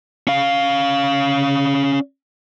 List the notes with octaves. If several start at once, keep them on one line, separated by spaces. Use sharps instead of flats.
C#4 F5